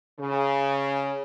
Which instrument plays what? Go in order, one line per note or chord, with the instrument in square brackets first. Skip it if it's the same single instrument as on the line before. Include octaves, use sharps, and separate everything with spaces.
[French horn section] C#3